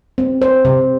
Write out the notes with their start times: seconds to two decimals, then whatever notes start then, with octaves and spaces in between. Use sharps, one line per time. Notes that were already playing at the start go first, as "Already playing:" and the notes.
0.18 C4
0.42 C5
0.65 C3